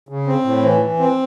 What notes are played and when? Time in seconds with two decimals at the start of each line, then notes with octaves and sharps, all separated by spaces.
0.09 C#3
0.27 C4
0.44 A2
0.63 E3
0.81 E3
0.99 C4